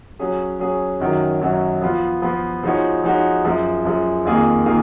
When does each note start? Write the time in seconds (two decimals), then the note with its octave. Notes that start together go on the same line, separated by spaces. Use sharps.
0.19 F#3 C#4 G#4
0.59 F#3 C#4 G#4
1.00 F#2 D#3 F#3 C#4 F#4
1.41 F#2 D#3 F#3 C#4 F#4
1.81 F3 B3 F4
2.22 F3 B3 F4
2.63 F3 G#3 D#4 F#4 C#5
3.04 F3 G#3 D#4 F#4 C#5
3.44 F#2 F3 G#3
3.85 F#2 F3 G#3
4.25 F2 D#3 A#3 F4 G#4
4.66 D#3 A#3 F4 G#4